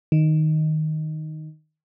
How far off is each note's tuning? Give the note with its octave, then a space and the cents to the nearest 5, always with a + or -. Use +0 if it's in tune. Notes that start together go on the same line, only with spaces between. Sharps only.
D#3 +0